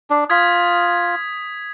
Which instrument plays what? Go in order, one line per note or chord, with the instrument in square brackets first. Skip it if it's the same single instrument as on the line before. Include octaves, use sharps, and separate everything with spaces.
[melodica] D4
[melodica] F4 [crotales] D#6 G#6 B6